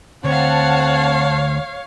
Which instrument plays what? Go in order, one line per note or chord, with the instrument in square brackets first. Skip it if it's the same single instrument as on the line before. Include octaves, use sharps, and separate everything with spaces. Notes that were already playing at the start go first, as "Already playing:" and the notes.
[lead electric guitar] D2 [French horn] C4 [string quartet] C#5 F5 [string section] F#5 A5